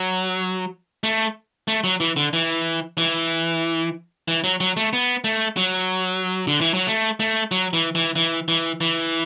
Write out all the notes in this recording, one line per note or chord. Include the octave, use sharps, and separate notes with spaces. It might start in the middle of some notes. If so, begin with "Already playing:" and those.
Already playing: F#3
A3
A3
F#3
E3
D3
E3
E3
E3
F#3
F#3
A3
B3
A3
F#3
D3
E3
F#3
A3
A3
F#3
E3
E3
E3
E3
E3